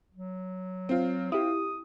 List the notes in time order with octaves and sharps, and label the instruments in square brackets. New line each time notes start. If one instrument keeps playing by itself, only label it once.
[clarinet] F#3
[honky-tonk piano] C4 F4
[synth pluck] E4 G4 [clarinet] D#6